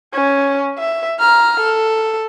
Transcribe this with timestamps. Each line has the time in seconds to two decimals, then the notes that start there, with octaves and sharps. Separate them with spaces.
0.14 C#4
0.79 E5
1.19 A#5 F6
1.60 A4